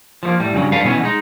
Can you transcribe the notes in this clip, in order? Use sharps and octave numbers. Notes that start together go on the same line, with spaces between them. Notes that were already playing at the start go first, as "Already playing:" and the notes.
F3 A3 A#3
A2 G3
G2 C#3 E3 F#3
G2 A4 B4 F5
B2 E3 F#3 B3 C#4
G#3 D#4